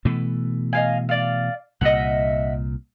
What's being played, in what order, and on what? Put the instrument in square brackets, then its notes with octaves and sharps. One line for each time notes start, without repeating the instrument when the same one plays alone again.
[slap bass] B2 E3 A3
[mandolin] D#5 F5 G#5
D5 F5
[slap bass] C2 A#2 [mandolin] D#5 E5 F#5